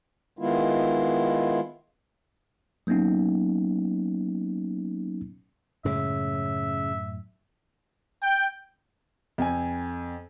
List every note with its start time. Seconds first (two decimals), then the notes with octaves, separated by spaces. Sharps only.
0.39 D#3 G#3 B3 E4 F4
2.87 F#3 A#3 B3 C#4 D#4
5.85 F#2 A2 C#3 G#3 E5
8.23 G5
9.38 F2 G#5